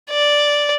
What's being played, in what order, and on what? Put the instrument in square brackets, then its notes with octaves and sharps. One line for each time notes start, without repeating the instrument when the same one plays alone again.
[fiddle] D5